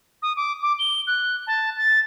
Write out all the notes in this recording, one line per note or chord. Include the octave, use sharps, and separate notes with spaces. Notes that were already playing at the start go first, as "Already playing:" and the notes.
D#6
D6
D6
G7
F#6
A5
A6